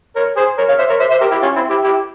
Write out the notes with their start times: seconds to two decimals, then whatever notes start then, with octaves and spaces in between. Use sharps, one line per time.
0.16 A#4 C#5
0.37 G#4 C5
0.58 A#4 C#5
0.68 C#5 F5
0.79 C5 E5
0.89 A#4 C#5
1.00 C5 E5
1.11 C5 E5
1.21 G4 A#4
1.31 E4 G4
1.42 C#4 F4
1.56 C4 E4
1.70 E4 G4
1.84 E4 G4